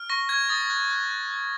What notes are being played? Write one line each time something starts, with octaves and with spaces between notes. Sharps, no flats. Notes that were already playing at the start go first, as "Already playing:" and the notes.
Already playing: F6
C#6 A#6
F6 G#6
D#6 A6
F#6
F#6
F#6
F#6